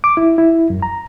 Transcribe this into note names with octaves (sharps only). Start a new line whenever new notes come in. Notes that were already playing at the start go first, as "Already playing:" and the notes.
D6
E4
E4
F#2
A#5